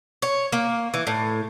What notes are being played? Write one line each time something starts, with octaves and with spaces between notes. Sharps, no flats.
C#5
A#3
E3
A2